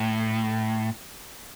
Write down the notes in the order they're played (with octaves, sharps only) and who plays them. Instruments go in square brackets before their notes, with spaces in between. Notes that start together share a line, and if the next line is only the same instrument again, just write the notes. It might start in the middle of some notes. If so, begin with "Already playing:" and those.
Already playing: [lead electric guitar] A2